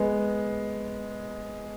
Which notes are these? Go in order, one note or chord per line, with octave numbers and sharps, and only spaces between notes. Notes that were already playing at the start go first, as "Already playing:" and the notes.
Already playing: G#3 B3